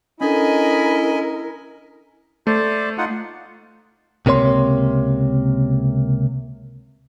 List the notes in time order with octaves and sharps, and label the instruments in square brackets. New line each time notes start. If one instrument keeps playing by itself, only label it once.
[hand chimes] C#4 D4 A4 [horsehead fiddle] E4 A#4 [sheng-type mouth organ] D#5 G#5 B5
[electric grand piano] A3 [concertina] C5 D5
[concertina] D#4 F4 F#5
[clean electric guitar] C#2 C3 A#3 C#5 C6